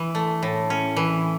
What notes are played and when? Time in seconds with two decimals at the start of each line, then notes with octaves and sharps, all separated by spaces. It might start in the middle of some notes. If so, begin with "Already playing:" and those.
Already playing: E3
0.15 A3
0.43 A2
0.70 C#4
0.96 E3